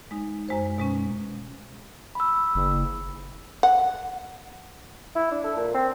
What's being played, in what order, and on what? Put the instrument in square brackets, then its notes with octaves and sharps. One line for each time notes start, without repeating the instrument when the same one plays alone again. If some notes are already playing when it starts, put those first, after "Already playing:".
[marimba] G#3 D#4
F#2 G#3 C5
B2 G#3 C#4
[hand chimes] B5 E6
[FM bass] F#1
[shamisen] F#5
[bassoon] E4
D4
A4
A#2
C4